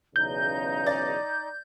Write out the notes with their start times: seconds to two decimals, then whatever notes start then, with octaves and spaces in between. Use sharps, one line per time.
0.16 B1 E2 C#3 D#4 G6
0.86 D5 A6